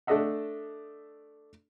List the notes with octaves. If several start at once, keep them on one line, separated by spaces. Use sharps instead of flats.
A3 D4 A4 D#5 E5 F#5